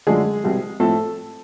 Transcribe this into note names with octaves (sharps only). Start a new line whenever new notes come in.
F#2 D3 F3 G#3 A3 D4 G#4
C2 B2 G3 C4
A2 F3 A3 C4 A4